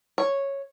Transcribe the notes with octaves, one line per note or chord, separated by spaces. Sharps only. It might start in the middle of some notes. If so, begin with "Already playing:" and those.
C#5